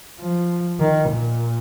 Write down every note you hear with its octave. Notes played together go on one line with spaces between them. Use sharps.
F3
D#3
A#2